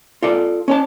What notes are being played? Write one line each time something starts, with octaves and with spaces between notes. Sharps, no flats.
F4 A4 D5
C#4 C#5 A5